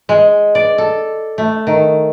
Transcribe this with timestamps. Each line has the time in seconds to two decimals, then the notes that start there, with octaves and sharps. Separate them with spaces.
0.09 G#3
0.55 D5
0.78 A4
1.38 A3
1.67 D#3